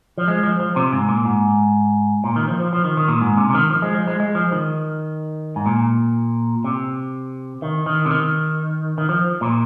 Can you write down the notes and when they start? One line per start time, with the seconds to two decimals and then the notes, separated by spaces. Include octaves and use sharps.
0.18 F3
0.28 G#3
0.43 F3
0.60 F3
0.76 C3
0.92 G#2
1.09 A#2
1.25 G#2
2.24 A#2
2.36 D#3
2.48 F3
2.60 F3
2.73 F3
2.84 D#3
2.97 D#3
3.08 A#2
3.21 G#2
3.37 C3
3.50 C3
3.54 D#3
3.71 F3
3.82 G#3
3.95 F3
4.08 G#3
4.20 G#3
4.35 F3
4.52 D#3
5.56 G#2
5.66 A#2
6.64 C3
7.62 D#3
7.86 D#3
8.06 C3
8.11 D#3
8.98 D#3
9.09 F3
9.41 A#2